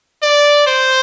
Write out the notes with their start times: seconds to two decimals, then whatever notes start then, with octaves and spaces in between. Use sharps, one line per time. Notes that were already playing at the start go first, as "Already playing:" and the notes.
0.22 D5
0.67 C5